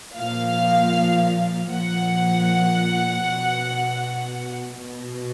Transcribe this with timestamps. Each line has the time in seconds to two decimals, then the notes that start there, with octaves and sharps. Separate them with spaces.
0.16 A#2 F3 F5
1.71 A#2 F3 F#5
3.27 B2
4.83 B2